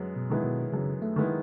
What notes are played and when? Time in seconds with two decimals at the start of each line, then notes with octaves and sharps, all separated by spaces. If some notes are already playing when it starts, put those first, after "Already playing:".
Already playing: F#2 G#3 B3
0.16 B2
0.30 D#3 G#3 B3 E4
0.44 B2
0.73 F#2 C#3
1.02 A3
1.16 D#3 G#3 B3 E4